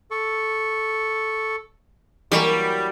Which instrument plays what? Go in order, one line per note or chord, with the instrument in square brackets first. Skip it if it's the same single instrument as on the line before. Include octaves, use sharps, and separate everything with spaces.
[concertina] A4 C#6
[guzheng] E3 F#3 A#3 [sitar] G3 [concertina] B5 D6